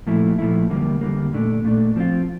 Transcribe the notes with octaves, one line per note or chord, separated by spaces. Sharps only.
A#2 F3 A3 E4
A#2 F3 A3 E4
E2 D3 G3 A#3
E2 D3 G3 A#3
A#2 A3 D4
A#2 A3 D4
F3 C4 F4